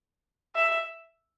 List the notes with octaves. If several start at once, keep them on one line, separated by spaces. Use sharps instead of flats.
E5